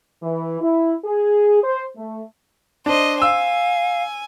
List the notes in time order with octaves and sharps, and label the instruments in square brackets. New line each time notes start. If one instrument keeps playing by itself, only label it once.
[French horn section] E3
E4
G#4
C5
A3
[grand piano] D4 [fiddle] C5 D#5
[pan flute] F5 [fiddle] G#5 [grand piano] E6